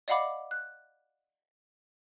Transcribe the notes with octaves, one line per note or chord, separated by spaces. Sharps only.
D5 D#5 F5 F#5 B5 D6
F#6